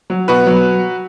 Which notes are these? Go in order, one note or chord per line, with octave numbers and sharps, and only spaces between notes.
F#3
B2 F#4 B4
F#3